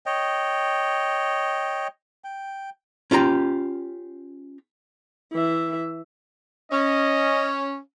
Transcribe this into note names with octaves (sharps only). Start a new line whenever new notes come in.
C#5 D#5 G5
G5
C#4 F4 G4 A#5
E3 E5
C#4 D#5